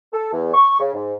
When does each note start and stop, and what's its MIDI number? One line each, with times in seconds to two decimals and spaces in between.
0.13 0.30 69
0.32 0.53 40
0.54 0.78 85
0.80 0.92 49
0.95 1.14 44